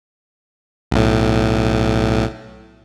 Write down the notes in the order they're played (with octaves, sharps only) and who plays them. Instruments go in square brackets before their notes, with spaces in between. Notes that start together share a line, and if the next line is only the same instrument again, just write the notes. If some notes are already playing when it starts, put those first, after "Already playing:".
[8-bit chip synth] B1 A2